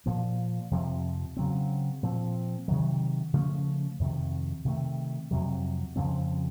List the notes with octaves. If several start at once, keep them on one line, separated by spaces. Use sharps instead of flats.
A#2 F3 A#3
F2 C3 F3
C#3 F#3 C4
A#2 F3 C4
C3 D#3 F#3
C#3 F3 A3 C#4
F2 C3 D#3
C3 D#3 A3
F2 C3 F#3
F2 C#3 F3 C4